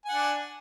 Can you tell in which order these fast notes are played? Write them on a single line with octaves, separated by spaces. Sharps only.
G#5 F#5 D4